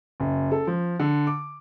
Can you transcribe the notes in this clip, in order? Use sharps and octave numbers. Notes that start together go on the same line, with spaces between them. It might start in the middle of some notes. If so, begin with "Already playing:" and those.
F#1
A4
F3
D3
D6